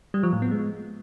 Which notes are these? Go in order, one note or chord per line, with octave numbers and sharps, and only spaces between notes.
G3
F3
A2
B3
G#3